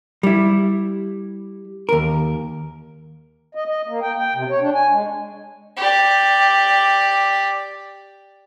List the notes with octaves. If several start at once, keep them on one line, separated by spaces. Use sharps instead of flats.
G3 E4
D#2 A#4
D#5
D#5
A#3
G5
G5
C3
C#5
D4
G#5
G#3
G4 D5